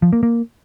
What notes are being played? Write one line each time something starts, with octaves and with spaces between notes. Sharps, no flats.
F3
A#3
A#3